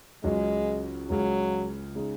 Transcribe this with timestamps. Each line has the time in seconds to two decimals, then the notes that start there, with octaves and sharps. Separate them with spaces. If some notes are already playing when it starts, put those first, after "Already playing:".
0.24 C#2 C#3 F#3 G#3 C#4 F#4
1.10 C#2 C#3 F#3 G#3
1.95 C#3 G#3 D#4